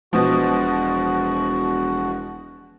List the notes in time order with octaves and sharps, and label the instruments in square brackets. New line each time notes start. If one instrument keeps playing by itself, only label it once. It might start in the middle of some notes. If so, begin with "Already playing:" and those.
[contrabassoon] E1 [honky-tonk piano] B2 F3 [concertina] F#4